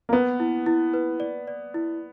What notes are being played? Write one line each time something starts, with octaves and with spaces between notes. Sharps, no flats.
A#3
B3 B4
E4
E4
B4
D5
D5
E4